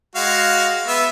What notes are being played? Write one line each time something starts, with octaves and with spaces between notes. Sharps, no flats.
G#3 F#4 F5
B3 E5